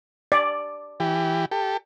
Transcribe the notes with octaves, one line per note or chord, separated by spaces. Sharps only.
D5
E3 G4
G4 A4